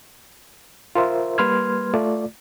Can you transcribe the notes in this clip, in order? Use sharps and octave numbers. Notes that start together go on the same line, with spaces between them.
F4 A#4 C5 E5
G3 A#3 B4 C6 F6 G#6
A3 F4 D5